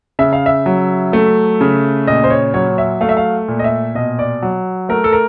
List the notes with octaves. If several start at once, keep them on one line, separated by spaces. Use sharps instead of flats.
C#3 E5
F5
E5
F#3
A3
C#3
A#2 D#5
C5
C#5
F#3 C#5
E5
A3 F5
E5
F5
A#2
D#5
E5
B2 D#5
D5
F#3
A3 A#4
A4
A#4